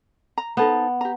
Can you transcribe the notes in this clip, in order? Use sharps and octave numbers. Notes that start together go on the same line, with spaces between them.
A#5
B3 D#4 A4 C5
G4 A#5